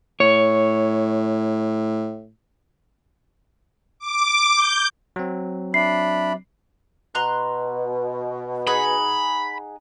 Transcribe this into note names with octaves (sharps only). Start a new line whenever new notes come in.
A2 C#5
D6
G6
F#3 C4
D4 E5 B5 C7
B2 A#5 C6 F#6
D#4 G#4 F#5 B5